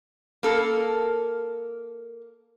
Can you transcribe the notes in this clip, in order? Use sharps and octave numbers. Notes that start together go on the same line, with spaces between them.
A#3 A4 A#4